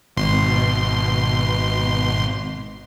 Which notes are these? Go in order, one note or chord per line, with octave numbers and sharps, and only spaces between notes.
G#1 B2 C6